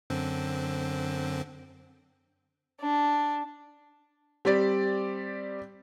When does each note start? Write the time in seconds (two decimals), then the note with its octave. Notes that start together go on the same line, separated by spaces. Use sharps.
0.10 F#2 D3 C4
2.80 D4
4.45 G3 C4 G4 D5